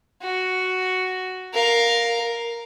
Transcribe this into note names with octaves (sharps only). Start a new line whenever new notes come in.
F#4
A#4 F5